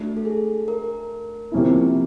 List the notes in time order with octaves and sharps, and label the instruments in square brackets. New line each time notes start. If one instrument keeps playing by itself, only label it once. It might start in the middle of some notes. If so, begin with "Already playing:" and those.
Already playing: [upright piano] A3 D4 F#4
[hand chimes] A4
G#4
A#4
[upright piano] C3 F3 A#3 C#4 E4